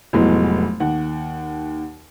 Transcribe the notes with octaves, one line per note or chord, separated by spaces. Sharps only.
F1 A2 F#3 G#3 B3
D#2 F#5